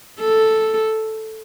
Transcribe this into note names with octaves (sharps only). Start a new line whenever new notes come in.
A4